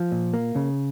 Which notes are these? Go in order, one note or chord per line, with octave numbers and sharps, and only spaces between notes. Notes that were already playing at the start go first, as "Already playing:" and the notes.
Already playing: F3
A#2
A#3
C#3